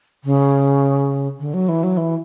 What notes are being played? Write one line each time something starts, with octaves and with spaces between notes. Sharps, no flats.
C#3
D3
F#3
E3
F#3
E3